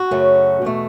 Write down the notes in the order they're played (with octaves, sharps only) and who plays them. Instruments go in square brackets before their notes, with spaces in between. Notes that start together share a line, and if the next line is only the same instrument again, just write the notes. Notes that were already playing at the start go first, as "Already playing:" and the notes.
Already playing: [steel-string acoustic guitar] F#4
F#2 C#3 F#3 A3 C#4
E2 B2 A3